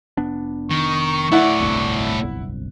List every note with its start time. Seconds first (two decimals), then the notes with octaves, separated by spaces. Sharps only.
0.17 F1 B3 D4
0.70 D#3 C#6
1.32 A2 E4 D5 F#5
1.60 D1 G1 C2